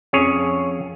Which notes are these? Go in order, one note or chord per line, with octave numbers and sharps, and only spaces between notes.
F2 C#4 G#4 C#5